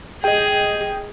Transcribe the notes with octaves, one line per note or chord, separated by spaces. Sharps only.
G#4 D#5 G5